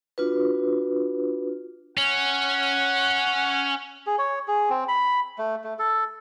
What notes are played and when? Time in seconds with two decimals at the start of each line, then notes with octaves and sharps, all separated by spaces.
0.18 D4 F4 F#4 B4
1.97 C#4 F#5
4.07 G#4
4.18 C#5
4.48 G#4
4.70 C4
4.88 B5
5.38 A3
5.64 A3
5.79 A4